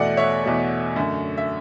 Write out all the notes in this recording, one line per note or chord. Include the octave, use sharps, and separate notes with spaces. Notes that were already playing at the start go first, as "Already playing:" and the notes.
Already playing: E2 B2 A3 D5 F#5
C#5 E5
E2 B2 A3
F#2 D3 A3
E5